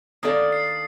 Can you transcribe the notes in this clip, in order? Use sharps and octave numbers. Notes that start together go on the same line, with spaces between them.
D#3 A#3 D4 A4 D5 D#6
C7